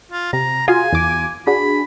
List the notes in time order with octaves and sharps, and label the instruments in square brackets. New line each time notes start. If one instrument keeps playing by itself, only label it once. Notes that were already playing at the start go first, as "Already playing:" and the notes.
[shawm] F4
[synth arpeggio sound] C3 [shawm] A#5
[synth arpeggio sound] F4 F#4 G#4 [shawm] G#5
[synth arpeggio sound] E2 D6
[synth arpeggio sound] D4 F#4 G#4 [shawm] B5